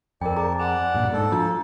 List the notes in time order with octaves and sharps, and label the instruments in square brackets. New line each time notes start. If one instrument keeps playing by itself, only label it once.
[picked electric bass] F2 [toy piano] A#4 G5 [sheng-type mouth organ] D5
[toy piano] G#4 A#5 D6 [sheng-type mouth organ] A5
[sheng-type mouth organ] D5 F#5 [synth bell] G#5
[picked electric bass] G2 A#2
[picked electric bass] G#2 [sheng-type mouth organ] A4
[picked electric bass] F3 [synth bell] D4